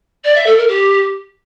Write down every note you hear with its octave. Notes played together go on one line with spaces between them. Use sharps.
D5
E5
A4
A#4
G4